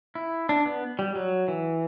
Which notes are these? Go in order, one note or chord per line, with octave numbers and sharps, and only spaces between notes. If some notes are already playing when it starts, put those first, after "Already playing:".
E4
D4
B3
G3
F#3
E3